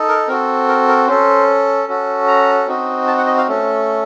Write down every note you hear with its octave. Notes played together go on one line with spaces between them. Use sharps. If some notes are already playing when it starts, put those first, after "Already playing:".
Already playing: D#4 A4
A#4
C4 F#4 A4 A#4
A#4
A#4
C#4 A4 C5
C#4 F#4 A4
A#5
C4 D#4 F#4
A5
F#5
D#5
F5
A3 C#4 A4